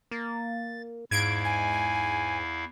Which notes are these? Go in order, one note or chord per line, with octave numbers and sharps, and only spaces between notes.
A#3 A6
E2 G#2 E4 F5 G#6 D7
G#5